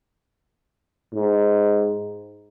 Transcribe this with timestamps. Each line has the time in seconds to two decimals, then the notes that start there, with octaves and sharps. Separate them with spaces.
1.14 G#2